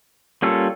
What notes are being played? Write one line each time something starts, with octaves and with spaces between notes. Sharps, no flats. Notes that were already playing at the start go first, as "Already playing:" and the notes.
G3 A#3 C#4 F4 A4